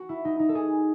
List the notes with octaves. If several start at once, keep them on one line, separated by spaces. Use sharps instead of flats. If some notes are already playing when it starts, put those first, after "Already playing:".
Already playing: F#4
E4
D#4
D#4
A4
G#4